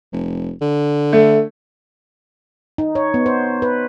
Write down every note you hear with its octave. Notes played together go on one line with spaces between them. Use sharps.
F1
D3
A3
D#4
C#5
B3
C5
B4